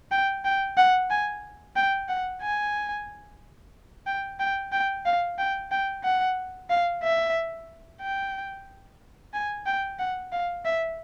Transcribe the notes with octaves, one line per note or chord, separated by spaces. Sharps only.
G5
G5
F#5
G#5
G5
F#5
G#5
G5
G5
G5
F5
G5
G5
F#5
F5
E5
G5
G#5
G5
F#5
F5
E5